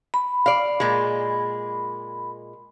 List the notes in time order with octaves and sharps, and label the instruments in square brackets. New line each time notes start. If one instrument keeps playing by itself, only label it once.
[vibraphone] B5
[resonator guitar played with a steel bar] D5 F5
A#2 G#3